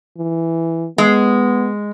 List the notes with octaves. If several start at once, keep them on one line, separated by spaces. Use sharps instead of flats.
E3
G#3 B3